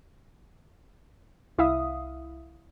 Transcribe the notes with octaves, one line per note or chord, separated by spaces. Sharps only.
C2 E4 E5 F5 D#6